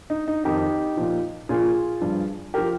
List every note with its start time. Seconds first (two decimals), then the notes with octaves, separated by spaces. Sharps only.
0.10 D#4
0.28 D#4
0.44 F2 D#3 D#4 G4
0.97 A#2 F3
1.49 A#2 F3 F4 G#4
2.01 G2 F3
2.54 F3 G4 A#4